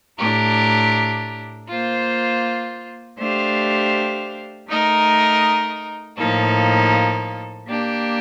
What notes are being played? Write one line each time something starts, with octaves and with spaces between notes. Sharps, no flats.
A2 A3 D4 G4 A#4
A#3 F4 C5
A3 D4 G4 C5 F5
A3 D#4 A#4 D#5
A2 F3 A#3 D#4 A4
A#3 D4 G4